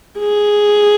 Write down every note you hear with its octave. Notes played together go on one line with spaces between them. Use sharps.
G#4